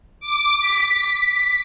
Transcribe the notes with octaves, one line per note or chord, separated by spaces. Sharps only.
D6
B6